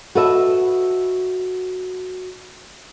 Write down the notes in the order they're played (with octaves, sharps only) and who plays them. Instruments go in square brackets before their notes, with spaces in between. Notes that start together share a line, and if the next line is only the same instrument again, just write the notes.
[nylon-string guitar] F#4 A4 B4 D#5 E5